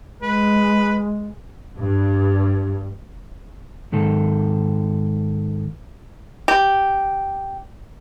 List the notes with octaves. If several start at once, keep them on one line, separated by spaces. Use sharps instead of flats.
G#3 B4
G2
G#2 D#3 A4
G4